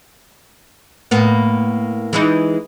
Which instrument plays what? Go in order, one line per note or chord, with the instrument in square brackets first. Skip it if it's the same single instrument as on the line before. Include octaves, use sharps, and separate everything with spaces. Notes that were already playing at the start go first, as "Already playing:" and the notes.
[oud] A2 A#3 B3
E3 G#3 D#4